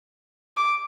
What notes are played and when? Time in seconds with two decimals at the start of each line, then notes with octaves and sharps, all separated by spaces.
0.57 D6